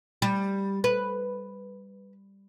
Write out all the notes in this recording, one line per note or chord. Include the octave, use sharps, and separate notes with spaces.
G3
B4